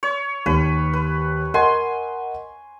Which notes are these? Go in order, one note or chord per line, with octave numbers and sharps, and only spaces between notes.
C#5
D#2 B4
B4
A#4 D#5 F#5 G#5 C6